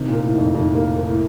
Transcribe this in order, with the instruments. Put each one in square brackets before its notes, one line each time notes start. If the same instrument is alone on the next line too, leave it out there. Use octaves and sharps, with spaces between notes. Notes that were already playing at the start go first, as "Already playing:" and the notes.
Already playing: [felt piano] C3 [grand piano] D#3
[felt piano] A#2
[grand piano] A#4
[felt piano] A2
[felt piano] F2 [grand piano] D#3
[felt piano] F2 [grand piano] D#3
[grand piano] A#3
A#4
[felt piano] A2